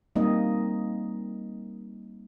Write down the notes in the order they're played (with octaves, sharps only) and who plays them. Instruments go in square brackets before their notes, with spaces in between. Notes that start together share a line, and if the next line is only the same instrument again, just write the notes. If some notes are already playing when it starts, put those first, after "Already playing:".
[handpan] G3 A#3 C4 D#4 D#5